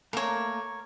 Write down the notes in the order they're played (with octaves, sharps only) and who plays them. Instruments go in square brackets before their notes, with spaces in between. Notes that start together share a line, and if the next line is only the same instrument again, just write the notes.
[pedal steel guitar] A3 A#3 [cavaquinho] A#4 C#5